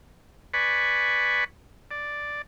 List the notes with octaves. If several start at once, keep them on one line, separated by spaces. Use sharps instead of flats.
B4 D5 G#5 B5 C#6
D5